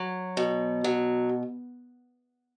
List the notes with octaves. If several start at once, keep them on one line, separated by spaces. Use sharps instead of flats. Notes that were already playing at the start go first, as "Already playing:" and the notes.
Already playing: F#3
B2
F#3